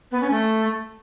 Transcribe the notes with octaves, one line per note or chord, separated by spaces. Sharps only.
B3
C#4
A3